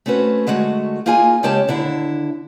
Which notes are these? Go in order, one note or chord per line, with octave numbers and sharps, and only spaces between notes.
A3 C4 C#4 F#4 B4
D3 G#3 A3 F#4
A#3 D#4 F4 G#4 G#5
C#3 G#3 C#4 G4 C#5 A5
D#2 D3 D4 E4